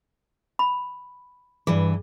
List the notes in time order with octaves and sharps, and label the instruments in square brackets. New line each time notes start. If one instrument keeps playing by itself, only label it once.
[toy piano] B5
[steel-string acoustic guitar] G2 E3 [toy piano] G#4